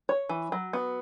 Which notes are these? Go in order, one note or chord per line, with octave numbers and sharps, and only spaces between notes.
C#5
E3
F#3
B3